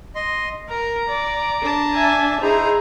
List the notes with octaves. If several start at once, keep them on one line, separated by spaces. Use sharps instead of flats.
D#5 C6
A#4 A#5
D5
D4 A5
E5 G#5
D#4 E4 G#4 C5 A#5